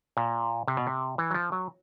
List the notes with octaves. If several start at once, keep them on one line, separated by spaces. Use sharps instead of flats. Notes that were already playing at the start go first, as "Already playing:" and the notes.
A#2
C3
B2
C3
E3
F#3
F3
F#3